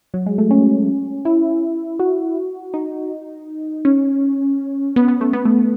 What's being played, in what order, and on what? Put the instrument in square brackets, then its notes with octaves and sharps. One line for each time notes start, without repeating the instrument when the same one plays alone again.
[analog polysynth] F#3
G#3
A3
C#4
E4
F#4
D#4
C#4
B3
B3
A3
B3
A3